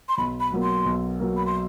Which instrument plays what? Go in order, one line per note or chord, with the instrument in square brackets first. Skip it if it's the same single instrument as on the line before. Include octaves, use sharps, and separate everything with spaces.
[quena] C6
[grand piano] B1 [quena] B5
[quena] B5
[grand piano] B2 F#3 A#3
[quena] C6
[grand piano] B1
B2 F#3 A#3
[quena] B5
C6